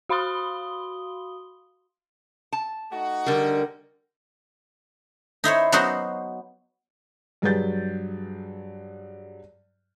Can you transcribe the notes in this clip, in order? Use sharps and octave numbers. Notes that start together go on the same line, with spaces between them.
F#4 F5 B5 C6 D#6 G7
A5
A3 D#4 F#4
D3 G3 A#4
D#4 E4 C5 C#5
F#3 B3 D#4 F#4 C5
G2 F#3 G#4 B4 G6 A6